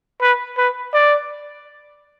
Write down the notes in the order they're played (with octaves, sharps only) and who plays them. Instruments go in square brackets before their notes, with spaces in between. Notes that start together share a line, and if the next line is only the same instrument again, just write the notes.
[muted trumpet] B4
B4
D5